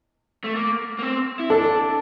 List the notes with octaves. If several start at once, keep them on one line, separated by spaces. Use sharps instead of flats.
A3
A#3
A#3
C4
E4
D4 A4